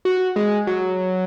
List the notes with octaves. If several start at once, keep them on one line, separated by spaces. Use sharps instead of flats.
F#4
G#3
F#3